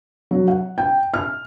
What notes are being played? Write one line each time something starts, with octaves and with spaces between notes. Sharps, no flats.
F#3
F#5
G5
F6